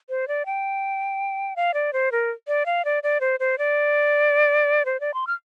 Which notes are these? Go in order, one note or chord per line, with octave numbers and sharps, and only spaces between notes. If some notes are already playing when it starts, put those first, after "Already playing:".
C5
D5
G5
F5
D5
C5
A#4
D5
F5
D5
D5
C5
C5
D5
C5
D5
C6
F6